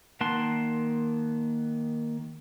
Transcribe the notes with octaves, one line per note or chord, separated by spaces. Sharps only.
D#3 A#3 F#5 A5 C6